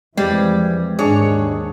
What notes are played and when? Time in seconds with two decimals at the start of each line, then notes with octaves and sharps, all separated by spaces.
0.17 F2 E3 G3 G#3
0.99 D#2 G#2 D4 G#4 C#5